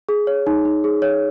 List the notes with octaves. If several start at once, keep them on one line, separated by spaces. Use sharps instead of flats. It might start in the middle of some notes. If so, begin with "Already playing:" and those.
G#4
C#5
D#4
D#4
G#4
C#5